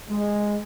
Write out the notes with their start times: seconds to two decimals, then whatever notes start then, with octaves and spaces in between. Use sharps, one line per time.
0.10 G#3